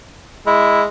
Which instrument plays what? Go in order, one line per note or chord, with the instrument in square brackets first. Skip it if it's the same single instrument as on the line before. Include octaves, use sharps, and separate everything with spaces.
[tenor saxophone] G#3 [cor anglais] E4